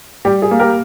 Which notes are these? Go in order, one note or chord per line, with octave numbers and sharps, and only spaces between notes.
G3 G4
G#4
A#3
G4 A#4